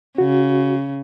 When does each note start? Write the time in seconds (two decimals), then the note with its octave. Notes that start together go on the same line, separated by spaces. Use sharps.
0.18 C#3 F#4